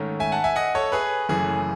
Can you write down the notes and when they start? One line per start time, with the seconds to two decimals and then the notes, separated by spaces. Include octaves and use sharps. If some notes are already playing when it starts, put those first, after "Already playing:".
Already playing: G#2 D#3 A3 C#4
0.20 E5 G#5
0.32 F#5 A5
0.44 E5 G#5
0.56 D#5 F#5
0.75 A4 C#5
0.92 G#4 B4
1.29 F#1 F#2 C#3 E3 A3 G#4